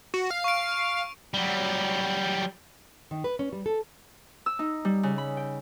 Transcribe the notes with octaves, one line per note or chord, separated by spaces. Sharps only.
F#4
F5
C#6 D7
F#3 G3
D#3
B4
C#4
G3
A4
E6
D#4
G3
C#3
B5
G5